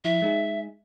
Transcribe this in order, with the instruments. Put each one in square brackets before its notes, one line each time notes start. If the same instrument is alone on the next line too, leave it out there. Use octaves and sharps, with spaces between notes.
[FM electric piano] F3 E4 [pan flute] E5
[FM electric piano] G#3 D#4 G#4